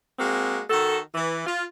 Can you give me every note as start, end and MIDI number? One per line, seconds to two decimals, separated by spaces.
0.19 0.60 56
0.19 0.60 58
0.19 0.60 60
0.19 0.60 66
0.69 0.98 51
0.69 0.98 66
0.69 0.98 69
1.14 1.45 52
1.46 1.62 65